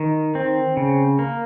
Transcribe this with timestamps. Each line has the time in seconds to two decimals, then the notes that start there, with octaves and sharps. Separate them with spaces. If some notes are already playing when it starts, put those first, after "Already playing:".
Already playing: D#3
0.35 C4
0.77 C#3
1.19 A#3